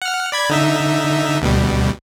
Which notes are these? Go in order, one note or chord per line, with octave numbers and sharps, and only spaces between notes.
F#5 F6
D5 B5 G#6
D3 D#4 E5
D2 B2 G3